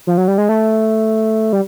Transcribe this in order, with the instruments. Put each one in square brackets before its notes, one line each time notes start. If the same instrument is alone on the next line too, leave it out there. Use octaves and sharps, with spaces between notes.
[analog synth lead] F3
F#3
G3
G#3
A3
G3